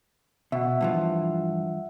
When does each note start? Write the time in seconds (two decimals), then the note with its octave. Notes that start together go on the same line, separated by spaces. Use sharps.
0.52 B2 E5 F#5
0.81 G2 E3 F3